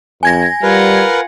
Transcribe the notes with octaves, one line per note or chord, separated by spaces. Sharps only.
F2 G#5 G#6 A#6
G3 F4 A#4 B4 F#5